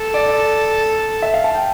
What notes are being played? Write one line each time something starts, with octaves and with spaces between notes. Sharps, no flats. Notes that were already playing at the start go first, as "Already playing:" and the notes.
Already playing: A4
D5
E5
F5
A5
G5